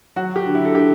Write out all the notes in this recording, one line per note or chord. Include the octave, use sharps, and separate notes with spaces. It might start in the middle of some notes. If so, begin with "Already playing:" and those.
F#3 F#4
G4
D3
E4
A4
D3 G4